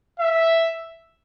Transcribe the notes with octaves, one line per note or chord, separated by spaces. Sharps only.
E5